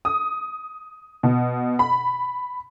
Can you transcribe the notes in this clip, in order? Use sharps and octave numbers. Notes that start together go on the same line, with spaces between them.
D#6
B2
B5